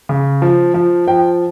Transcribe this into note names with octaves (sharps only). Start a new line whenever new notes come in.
C#3
F3
F3
F3 G5